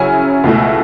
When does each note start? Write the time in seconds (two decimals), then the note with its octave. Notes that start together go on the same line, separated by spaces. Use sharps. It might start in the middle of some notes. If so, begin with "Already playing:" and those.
Already playing: C#3 F#3 C#4 E4 G#5
0.44 C#2 B2 A3 E4